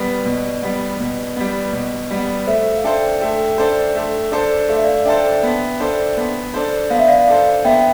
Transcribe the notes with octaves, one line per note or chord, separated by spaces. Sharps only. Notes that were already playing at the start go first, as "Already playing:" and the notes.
Already playing: G3 B3 B4 D5
B2
G3 B3
B2
G3 B3
B2
G3 B3
A3 C5 E5
F5
D4 A4 C5 E5 G5
A3 E5 G5
D4 A4 C5
A3
D4 A4 C5
A3 F5
E5
D5 F5
D4 A4 C5 E5 G5
B3
D4 A4 C5
B3
D4 A4 C5
B3 F5
E5
D5 F5
D4 A4 C5
B3 E5 G5